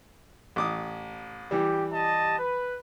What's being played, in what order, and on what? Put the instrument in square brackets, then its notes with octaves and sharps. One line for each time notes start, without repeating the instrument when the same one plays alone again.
[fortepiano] A1 D6 D#6
[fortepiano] E3 G3 [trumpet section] G4
[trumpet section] G4 D#5 A5
B4